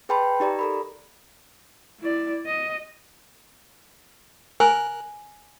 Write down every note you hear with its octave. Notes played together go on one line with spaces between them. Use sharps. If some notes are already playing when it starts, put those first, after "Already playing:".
G#4 B4 G5 A5 B5 C6
D#4 G4 D5 A#5
A4 A#4 B5
E4 D5
D#5
A#4 G#5 F#6